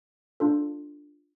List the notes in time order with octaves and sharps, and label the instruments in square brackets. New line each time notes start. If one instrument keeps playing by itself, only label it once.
[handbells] D4 F4 A4